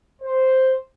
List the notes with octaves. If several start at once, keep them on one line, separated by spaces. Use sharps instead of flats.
C5